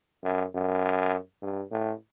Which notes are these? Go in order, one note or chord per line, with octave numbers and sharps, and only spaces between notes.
F#2
F#2
G2
A2